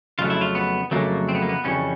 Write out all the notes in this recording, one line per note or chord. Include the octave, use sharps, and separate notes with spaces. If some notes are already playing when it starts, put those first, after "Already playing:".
F2 C#3 F#3 A3 F4
E4
F4
B3
F2 C#3 F#3 A3 A#3
C4
B3
A#3
B3
F2 C#3 E3 G3 C#4